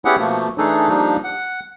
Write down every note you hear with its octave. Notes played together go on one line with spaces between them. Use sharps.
B3 C#4 E4 G4 G#4 F#5
B2 F3 A3 A#3
E3 A3 D4 D#4 G#4 A4
F3 G3 A#3 D4 D#4
F#5